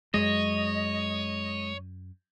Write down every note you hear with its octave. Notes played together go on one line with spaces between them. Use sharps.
F#2 F#3 G#3 C#5 D#5